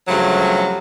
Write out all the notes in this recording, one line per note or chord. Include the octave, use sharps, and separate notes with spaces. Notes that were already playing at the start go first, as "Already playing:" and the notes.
G2 C#3 F3 F#3 A3